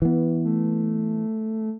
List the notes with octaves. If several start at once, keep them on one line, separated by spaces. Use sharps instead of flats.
E3 B3
A3